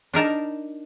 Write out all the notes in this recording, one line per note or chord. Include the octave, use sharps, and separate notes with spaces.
D4 D#4 A#4 A5